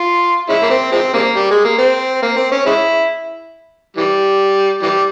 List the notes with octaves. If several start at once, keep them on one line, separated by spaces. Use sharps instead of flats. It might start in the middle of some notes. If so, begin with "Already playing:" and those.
Already playing: F4
G#3 C#4 E4
A#3
C4
F3 G#3 C4
C#3 G3 A#3
G3
G#3
A#3
C4
A#3
C4
C#4
G#3 C#4 E4
E3 G3
E3 G3